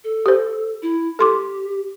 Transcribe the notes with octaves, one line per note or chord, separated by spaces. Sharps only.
A4
G4 C5
E4
G4 A4 C6 D6